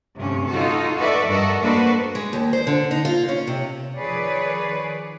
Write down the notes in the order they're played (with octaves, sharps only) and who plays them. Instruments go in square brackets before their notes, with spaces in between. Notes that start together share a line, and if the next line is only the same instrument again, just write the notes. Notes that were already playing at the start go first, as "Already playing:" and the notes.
[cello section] D2 G2 C3 C#4
D#4 F4 F#4 A4
F#4 A4 B4 D5 E5
G2 F#4 A4 A#4 D#5
A#3 D4 F#4 A4 B4 C5
[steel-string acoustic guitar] G#3
D#2
C5
D3
D#4
F4
C#4
C3
[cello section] D#3 F3 G#4 B4 C#5 D5